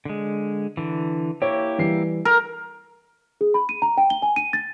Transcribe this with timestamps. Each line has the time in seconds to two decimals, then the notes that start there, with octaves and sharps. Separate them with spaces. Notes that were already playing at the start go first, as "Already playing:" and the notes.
0.05 D3 G#3
0.77 D3 E3
1.42 A#3 E4 G4 C#5
1.78 E3 G3 C7
2.25 A#4
3.41 G#4
3.54 B5
3.69 D#7
3.82 A#5
3.98 G5
4.10 G7
4.22 G#5
4.36 D#7
4.53 A6